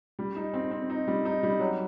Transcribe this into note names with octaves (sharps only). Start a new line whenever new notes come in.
G3
D#4
C4
C4
D#4
G3
D#4
G3
F#3